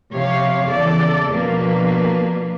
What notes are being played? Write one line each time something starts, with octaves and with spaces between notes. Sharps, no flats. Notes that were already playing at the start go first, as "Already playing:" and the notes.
C3 F3 G4 C#5 F5
E2 C#3 A4 D5
B2 F3 A#3 D4 B4